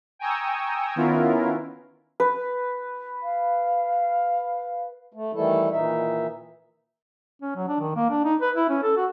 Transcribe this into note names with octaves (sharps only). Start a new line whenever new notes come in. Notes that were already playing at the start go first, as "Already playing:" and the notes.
G5 G#5 A#5 C#6 D#6 E6
D#3 B3 C#4 E4 F4 A#4
B4
F5
A3
D#3 E3 G3 A3 E4 A4
A#2 D#3 E3 D#4 E5
C#4
F#3
D4
D#3
A#3
D4
D#4
B4
E4
C#4
A4
F#4